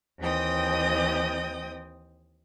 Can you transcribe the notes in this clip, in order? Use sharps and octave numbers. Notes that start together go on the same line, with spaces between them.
D#2 E3 C4 D#5 G5 D#6